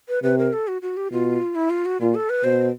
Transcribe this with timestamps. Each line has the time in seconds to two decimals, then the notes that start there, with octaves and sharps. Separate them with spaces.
0.08 B4
0.23 C3 B4
0.38 A#4
0.53 A4
0.68 F#4
0.82 F#4
0.97 G4
1.11 B2 F4
1.55 E4
1.70 F4
1.86 F#4
2.00 A#2 F4
2.15 A4
2.30 B4
2.44 B2 C5